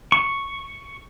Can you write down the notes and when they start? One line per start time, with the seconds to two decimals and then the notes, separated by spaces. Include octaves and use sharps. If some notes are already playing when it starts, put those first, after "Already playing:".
0.12 C#6